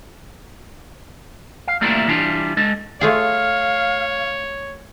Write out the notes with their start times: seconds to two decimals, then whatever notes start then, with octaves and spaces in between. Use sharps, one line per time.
1.67 F5
1.81 G3 A3 A#3 D4 E4 F4
2.08 E3 G3 D4 F4
2.57 G#3 A4
3.01 A3 F4 G#4 C#5 F5